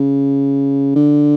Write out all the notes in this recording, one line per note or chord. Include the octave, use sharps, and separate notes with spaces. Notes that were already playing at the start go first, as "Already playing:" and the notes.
Already playing: C#3
D3